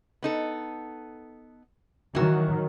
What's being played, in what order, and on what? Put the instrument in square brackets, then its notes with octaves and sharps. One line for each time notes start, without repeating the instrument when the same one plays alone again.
[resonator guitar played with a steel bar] B3 D#4 A4
[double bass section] D#3 F#3 [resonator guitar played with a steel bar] E3 F#4